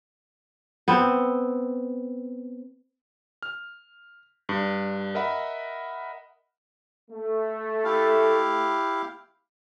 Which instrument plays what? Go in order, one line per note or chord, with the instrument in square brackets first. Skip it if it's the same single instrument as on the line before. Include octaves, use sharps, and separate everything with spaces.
[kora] B3 C4
[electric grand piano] F6
G2
A#4 D#5 E5 F#5 B5
[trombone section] A3
[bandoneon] E4 G4 F5